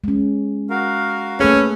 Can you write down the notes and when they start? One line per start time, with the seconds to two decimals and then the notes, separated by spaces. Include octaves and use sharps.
0.04 G#3 C#4
0.70 F#4 A#4 F5
1.40 A3 A#3 C#4 G#4 A4 B4